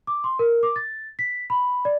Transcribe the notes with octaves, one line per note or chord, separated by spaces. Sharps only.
D6
C6
A#4
D6
A6
B6
B5
D5